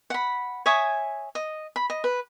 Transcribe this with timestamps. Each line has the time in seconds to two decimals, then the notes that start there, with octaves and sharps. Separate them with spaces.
0.10 F#5 B5
0.66 C#5 E5 G#5 D#6
1.35 D#5
1.76 B5
1.90 D#5
2.04 B4